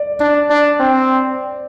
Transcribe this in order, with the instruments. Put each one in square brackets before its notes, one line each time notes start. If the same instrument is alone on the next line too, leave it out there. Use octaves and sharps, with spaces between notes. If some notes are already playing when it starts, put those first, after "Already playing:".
Already playing: [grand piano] D5
[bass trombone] D4
D4
C4